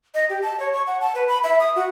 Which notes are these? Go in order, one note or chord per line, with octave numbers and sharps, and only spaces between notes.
D#5
G4
A5
C#5
C#6
F#5
A5
B4
B5
E5
D#6
F#4